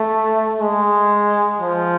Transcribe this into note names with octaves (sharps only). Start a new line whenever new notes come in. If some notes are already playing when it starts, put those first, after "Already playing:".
Already playing: A3
G#3
F3